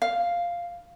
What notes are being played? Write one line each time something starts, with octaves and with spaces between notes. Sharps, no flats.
F5